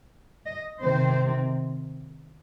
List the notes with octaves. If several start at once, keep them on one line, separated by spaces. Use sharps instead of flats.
D#5
C3 D#3 C4 C5